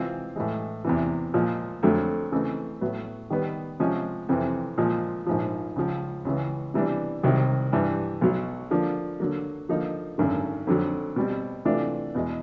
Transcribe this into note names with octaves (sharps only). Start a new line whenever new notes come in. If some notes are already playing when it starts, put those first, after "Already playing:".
Already playing: C3 E3 G#3 C4 F4
A2 E3 G#3
E2 C3 E3
A#2 F3 G#3
F2 D3 F#3 A3
C#3 E3 A3 C4 D#4
A2 F#3 B3
D#3 G3 B3
C3 F3 G#3 C#4
F2 C3 E3
A#2 F3 G#3
A#1 G#2 F3
C#2 C#3 F3
C#2 C#3 E3
C3 E3 G3 B3 D4
C2 C3 D#3 F#3
G2 E3 G3
B1 B2 F#3
D3 F3 A#3 D4
D3 F#3 A#3
D3 F3 A#3 D#4
G#1 F#2 D3
F2 D3 F#3
B2 G3 C4
C3 E3 A3 D4 F4
E2 B2 G#3